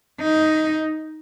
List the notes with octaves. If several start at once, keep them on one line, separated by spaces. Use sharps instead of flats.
D#4